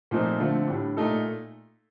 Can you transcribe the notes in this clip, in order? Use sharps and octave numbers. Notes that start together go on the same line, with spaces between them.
A#2 F3 A3 C4 D#4
D3 F3 A3 C4 F4
A2 G3 D4
A#2 A3 D#4 A4